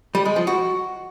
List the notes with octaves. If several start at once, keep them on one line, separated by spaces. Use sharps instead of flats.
G3
G#3
F3
F#4